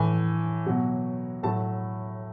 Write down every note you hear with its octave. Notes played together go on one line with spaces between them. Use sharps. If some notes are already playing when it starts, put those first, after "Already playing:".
Already playing: A2 E3 G#5
B2 F#3
A2 F#3 A5